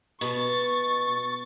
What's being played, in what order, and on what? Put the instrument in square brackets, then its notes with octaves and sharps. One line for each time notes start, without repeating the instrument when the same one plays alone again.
[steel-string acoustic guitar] B2 [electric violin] C#6 A6